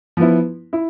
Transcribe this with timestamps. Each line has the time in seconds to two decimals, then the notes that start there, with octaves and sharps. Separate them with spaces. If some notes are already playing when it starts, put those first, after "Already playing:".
0.17 F3 B3 E4
0.73 E4